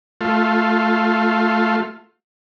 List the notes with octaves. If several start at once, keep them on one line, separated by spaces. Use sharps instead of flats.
A3 F4